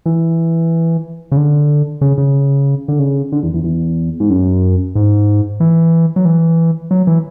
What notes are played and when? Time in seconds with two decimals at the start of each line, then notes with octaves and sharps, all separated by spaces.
0.06 E3
1.32 C#3
1.37 D3
2.01 C#3
2.18 C#3
2.88 D3
2.99 C#3
3.32 D3
3.43 E2
3.54 E2
3.64 E2
4.20 G#2
4.30 F#2
4.95 G#2
5.60 E3
6.16 F#3
6.25 E3
6.91 F#3
7.07 E3